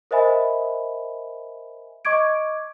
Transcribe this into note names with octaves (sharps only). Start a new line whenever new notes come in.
A#4 C5 D#5 E5 G#5 B5
D#5 C#6 D6 G#6 D7